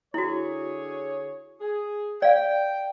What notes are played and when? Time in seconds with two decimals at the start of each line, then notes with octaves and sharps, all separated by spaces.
0.14 D3 E4 F#4 G#4 C#5
1.61 G#4
2.22 D5 F5 G5